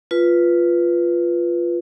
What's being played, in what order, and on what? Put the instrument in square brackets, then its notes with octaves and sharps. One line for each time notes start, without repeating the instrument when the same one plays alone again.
[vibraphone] F4 B4